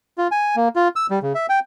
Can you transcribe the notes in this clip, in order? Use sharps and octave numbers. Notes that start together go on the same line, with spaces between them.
F4
G#5
A#3
F4
E6
G3
C#3
E5
G5